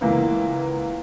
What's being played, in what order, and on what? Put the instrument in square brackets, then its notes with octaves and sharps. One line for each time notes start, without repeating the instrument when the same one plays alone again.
[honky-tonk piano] C#2 E3 A#3 B3